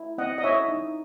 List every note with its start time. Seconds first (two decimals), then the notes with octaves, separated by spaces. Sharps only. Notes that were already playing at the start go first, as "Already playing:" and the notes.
Already playing: E4
0.18 C4 D#5 F#5
0.38 D#5
0.43 E4 C#5 E5
0.68 D#4